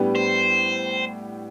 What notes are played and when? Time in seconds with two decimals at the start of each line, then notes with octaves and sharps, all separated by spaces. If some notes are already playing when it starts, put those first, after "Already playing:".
Already playing: A2 G3 B3 D4 G4
0.15 C5